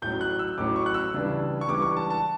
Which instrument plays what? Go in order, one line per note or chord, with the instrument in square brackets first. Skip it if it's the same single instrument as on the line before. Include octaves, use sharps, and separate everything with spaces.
[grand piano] A1 A2 F#3 C#4 G6
F#6
E6
A1 A2 F#3 C#4 D6
C#6
F#6
E6
C#2 C#3 E3 G3 D4
C#6
C#2 C#3 E3 G3 D4 D6
C#6
A5
A5